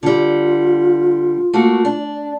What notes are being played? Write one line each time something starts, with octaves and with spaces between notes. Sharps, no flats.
D3 G3 F4
A3 A#3 F#4
D4